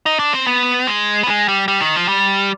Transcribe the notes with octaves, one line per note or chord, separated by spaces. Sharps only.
D#4
D4
C4
B3
G#3
B3
G#3
G3
G3
D#3
F3
G3